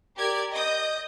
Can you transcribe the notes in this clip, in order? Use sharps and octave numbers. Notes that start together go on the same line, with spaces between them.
G4 A#4 D5 G#6
D#5 D#6 G6